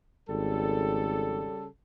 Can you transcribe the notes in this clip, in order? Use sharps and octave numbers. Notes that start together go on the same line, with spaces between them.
G#1 C#3 G3 A4